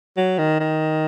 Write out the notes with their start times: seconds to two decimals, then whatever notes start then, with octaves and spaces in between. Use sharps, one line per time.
0.17 F#3
0.38 D#3
0.60 D#3